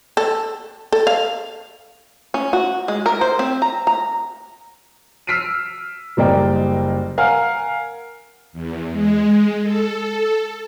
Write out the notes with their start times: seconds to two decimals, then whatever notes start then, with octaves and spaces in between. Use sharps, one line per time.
0.17 A4
0.92 A4
1.07 F5
2.34 C#4
2.53 F#4
2.88 G#3
3.06 A#4
3.21 C5
3.39 C4
3.62 A#5
3.87 A#5
5.27 E6 F6 B6 C7 D7 D#7
6.17 F#1 G3 A#3 D5 D#5 G5
7.18 A#4 F5 F#5 G#5 F6
8.53 E2
8.92 G#3
9.63 A4